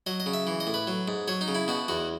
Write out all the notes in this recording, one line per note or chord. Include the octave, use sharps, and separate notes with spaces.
F#3 D#5
D#5
C#3
E5
E3
D#5
A2
B4
F#3
G#2
F#3 C#5
D#4
C#3
E4
B2 F#4
E2 F#4